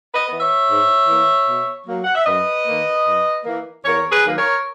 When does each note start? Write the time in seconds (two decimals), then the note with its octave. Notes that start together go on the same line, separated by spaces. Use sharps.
0.14 B4 D#5
0.28 E3 B3
0.41 C#5 E5
0.68 G#2
1.07 E3 A#3
1.47 B2
1.87 F#3 A#3
2.05 F#5
2.15 E5
2.26 F#2 B4 D#5
2.66 D#3 A#3
3.06 F#2
3.46 E3 A#3
3.85 E2 A#4 C#5
4.12 G#4 B4
4.25 D#3 F#3 A#3
4.38 A#4 C#5